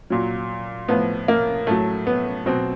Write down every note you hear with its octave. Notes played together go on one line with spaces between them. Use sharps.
A#2 F#3
A2 F3 B3
A#3
A2 F#3 A3
B3
B2 F#3 C4